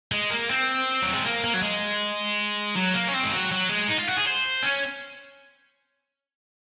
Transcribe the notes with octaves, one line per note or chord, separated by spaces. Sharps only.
G#3
A#3
C4
F#3
G#3
A#3
A#3
F#3
G#3
F#3
A#3
C#4
C4
G#3
F#3
F#3
G#3
D#4
F4
F#4
G#4
C5
C#4